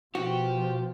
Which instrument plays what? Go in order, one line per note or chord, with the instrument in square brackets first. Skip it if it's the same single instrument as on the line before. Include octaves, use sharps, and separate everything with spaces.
[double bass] B2 F3 [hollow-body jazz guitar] F#4 [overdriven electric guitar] G4